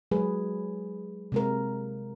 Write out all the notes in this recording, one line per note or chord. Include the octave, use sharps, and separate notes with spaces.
F#3 G#3 G#4 B4
C3 G#3 A#4